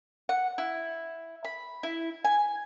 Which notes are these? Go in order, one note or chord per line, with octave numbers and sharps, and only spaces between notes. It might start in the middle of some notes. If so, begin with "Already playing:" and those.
F#5
E4
B5
E4
G#5